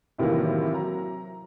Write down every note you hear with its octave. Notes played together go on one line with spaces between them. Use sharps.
A2 C3 D#3 E3 F#3 A#3
F#3 A#5